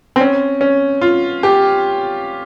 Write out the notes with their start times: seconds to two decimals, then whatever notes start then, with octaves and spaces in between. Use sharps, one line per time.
0.16 C4
0.21 C#4
0.61 C#4
1.02 F4
1.43 G4